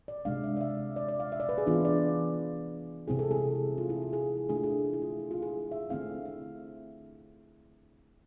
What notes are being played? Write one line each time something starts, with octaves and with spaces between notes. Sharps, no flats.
D5
C3 G#3 D4 F5
E5
D5
E5
D5
D5
F5
E5
D5
B4
G#4
E3 B3 D4 F4
D5
C3 G#3 C4 E4 G#4
A4
G#4
F4
E4
F4
G#4
D3 A3 D4 G#4
F4
G#4
F4
E4
F4
E4
F4
G#4
E5
D3 A3 C4 E4 F5
E5